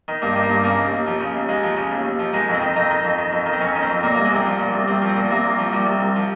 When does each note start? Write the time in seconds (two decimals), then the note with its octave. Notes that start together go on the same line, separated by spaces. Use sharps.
0.08 D#3
0.22 G2 A#3
0.36 D#3
0.43 A#3
0.50 G2
0.64 C#3 A#3
0.78 D#2
0.92 D#2
1.07 F3
1.20 C#3
1.35 D#2
1.49 D#2 G#3
1.63 F3
1.77 C#3
1.92 D#2
2.05 D#2
2.19 F3
2.33 D#3 G#3
2.48 F2
2.55 C4
2.62 D#3
2.76 F2 D#4
2.91 D#3
3.05 F2
3.19 D#3
3.33 F2
3.46 D#3
3.53 C4
3.61 F2 C#4
3.76 D#3
3.82 C4
3.90 F2
4.03 A#2 A#3
4.14 C2 A#3
4.25 G#3
4.32 C2 C4
4.46 F3
4.60 A#2
4.74 C2
4.88 C2 C4
5.02 F3
5.09 C4
5.16 A#2
5.31 C2 A#3
5.44 C2
5.58 F3
5.72 A#2 G3
5.87 C2
6.01 C2
6.16 F3